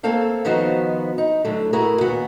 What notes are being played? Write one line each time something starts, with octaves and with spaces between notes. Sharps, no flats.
A3 A#3 C4 A4 F5 G5
D#3 F3 B3 D#4 F#4 C5
D#4
A2 D3 F#3 A3
A3 E4 F#4 G#4 A#4
D#2 A#2 B3 F#4 F#5